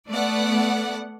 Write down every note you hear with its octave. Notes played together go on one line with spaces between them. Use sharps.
A3 B3 A4 D5 F#5